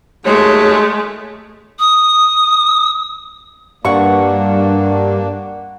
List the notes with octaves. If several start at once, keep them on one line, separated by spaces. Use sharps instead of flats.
D#2 F#3 G#3 A3 C#5
D#6
G2 A#3 D4 F#5 C#6